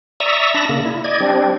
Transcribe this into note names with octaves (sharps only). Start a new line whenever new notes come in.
D5 E5 A#5 C#6 D#6 E6
D4 A5 B5 A#6
C#3 A#3
E4
D5 D#5 G#6
G3 C4 D4